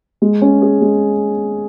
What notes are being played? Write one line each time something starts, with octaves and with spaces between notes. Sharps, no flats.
G#3
C#4
G#4
G#3